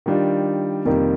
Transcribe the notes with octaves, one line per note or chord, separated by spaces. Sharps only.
D#3 G3 D4 F4
F2 C3 D#3 G3 A#3